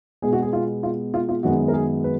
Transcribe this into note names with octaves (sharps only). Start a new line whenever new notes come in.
B2 G#3 B3 G#4
F#4
G#4
F4
F4
F4
F4
F#2 D#3 G#3 B3 F#4
A#4
G#4
B4